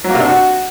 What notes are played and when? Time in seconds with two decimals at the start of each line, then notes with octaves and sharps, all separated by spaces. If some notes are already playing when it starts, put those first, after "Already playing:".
0.04 F#3
0.10 A#3
0.15 C3
0.20 D4
0.26 F#4